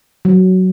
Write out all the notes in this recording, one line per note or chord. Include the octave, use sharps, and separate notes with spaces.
F#3